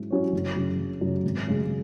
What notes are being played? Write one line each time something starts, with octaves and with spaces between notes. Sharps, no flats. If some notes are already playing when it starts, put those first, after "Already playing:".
Already playing: G#2 F#3 C#4 E4
F#3 C#4 E4 C#5
F#1
F#2 C#3
F#1
F#2 C#3
G#1
F#2 C#3 G#3